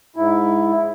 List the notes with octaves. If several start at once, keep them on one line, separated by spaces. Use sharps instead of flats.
G#2 E4